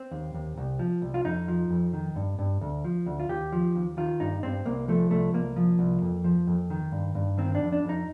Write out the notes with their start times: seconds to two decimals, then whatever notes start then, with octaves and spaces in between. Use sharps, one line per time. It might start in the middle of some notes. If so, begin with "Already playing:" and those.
Already playing: C4
0.11 D#2
0.35 D#2
0.57 C2
0.79 F3
1.02 C2
1.14 F4
1.25 F2 D#4
1.48 F3
1.70 F2
1.93 D#3
2.16 G2
2.39 G2
2.61 D2
2.84 F3
3.06 D2
3.20 F4
3.29 D#2 G4
3.52 F3
3.75 D#2
3.97 D#3 F4
4.20 G2 D#4
4.43 G2 C4
4.66 C2 A#3
4.88 F3 A3
5.11 C2 A3
5.33 C2 A#3
5.56 F3
5.79 C2
6.02 F2
6.24 F3
6.47 F2
6.70 D#3
6.92 G2
7.15 G2
7.38 D#3 C4
7.55 D4
7.61 F2
7.72 D4
7.84 F2
7.89 D#4